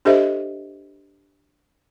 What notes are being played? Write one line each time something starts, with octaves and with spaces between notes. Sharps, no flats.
D4 G4 A4 C5 D#5 E5